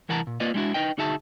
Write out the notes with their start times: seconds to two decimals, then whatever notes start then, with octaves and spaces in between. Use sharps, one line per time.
0.09 C2 E3 A#4 F#5 A5 A#5
0.27 A#2
0.40 A#3 F4 B4 D5 D#5
0.54 G3 G#3 D4 E4 F#4
0.74 D#4 B4 D#5 G5
0.97 D2 D#4 F#4 G#4 E5 A5